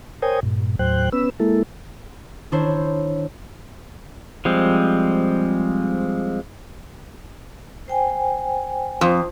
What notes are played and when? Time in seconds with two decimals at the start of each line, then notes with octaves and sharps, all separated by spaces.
0.22 A#4 C5 C#5 G5 G#5 D#6
0.43 G2 A#2
0.79 D#2 A2 F#3 C5 G5 F#6
1.12 B3 C#4 B4 E6
1.40 G#3 A#3 E4 A4
2.52 D#3 D4 E4 C5 C#5
4.45 F3 G3 G#3 C4
7.88 C5 G5 G#5
9.01 F2 F4 C5 D#6